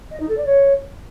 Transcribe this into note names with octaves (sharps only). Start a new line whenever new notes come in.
D#5
D#4
A4
D5
C#5